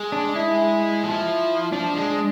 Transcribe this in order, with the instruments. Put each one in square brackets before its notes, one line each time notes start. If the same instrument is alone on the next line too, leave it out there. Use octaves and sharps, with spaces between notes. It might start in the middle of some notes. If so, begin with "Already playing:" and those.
Already playing: [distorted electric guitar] G#3
[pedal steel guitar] D4
E4
[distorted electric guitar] F3
[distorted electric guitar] F3 [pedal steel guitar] D4
[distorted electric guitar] G#3